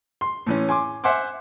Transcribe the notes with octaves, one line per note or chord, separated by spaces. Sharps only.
C6
A2 E3 C#4
G#5 C6 D6
C5 E5 F#5 G#5 C6 D6